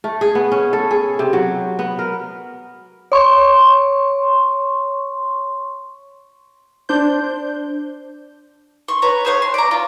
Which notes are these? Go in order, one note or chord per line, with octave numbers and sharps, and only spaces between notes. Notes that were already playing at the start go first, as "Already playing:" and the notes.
A3
G#4
B3
C#4
A4
G#4
C3
F#3
B3
A#4
C#5 C6 C#6
D4 C5 G6
C6 C#6
B4 C#5 A#5
G#4 C5 C#5 F#5
C6
D5 A#5
F4